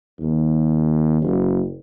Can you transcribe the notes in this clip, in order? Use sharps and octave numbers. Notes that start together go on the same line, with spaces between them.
D#2
F#1